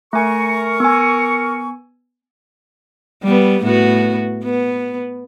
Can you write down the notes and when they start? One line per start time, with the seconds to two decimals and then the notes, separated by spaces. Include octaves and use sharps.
0.13 A3 A#4 G#5 C#6
0.80 B3 G#5
3.23 G3 B3
3.63 A2 B3 F#4
4.44 B3